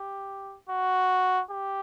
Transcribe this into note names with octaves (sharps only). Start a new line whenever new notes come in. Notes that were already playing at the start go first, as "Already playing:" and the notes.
Already playing: G4
F#4
G4